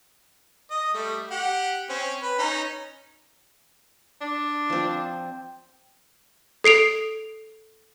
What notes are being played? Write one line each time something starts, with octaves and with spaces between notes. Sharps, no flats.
D#5
G3 A3
G4 F#5
C4 C#4
B4
C#4 D#4
D4
F3 C4
A4 C7 D7 F7